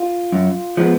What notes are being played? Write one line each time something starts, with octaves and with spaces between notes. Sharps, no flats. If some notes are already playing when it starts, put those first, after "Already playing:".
Already playing: F4
F#2
F3 G#3 B3